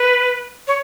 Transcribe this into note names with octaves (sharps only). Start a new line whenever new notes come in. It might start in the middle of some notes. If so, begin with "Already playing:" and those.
Already playing: B4
C#5